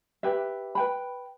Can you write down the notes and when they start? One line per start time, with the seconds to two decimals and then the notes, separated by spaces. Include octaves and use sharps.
0.23 G4 B4 E5
0.75 B4 G5 B5